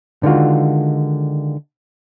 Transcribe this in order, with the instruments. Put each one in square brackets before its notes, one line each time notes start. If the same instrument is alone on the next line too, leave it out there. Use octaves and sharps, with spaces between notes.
[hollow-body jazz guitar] D3 D#3 G#3 F4 F#4